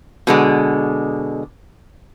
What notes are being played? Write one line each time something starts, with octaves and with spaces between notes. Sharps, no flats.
B2 D3 G#3